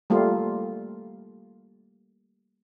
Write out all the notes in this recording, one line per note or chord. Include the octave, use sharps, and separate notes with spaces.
G3 A3 A#3 F4